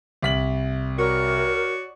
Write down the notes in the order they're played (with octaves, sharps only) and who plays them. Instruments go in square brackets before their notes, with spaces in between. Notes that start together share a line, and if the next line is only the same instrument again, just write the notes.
[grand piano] C2 B6 F#7
[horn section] F#4 C#5 D5 [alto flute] A#4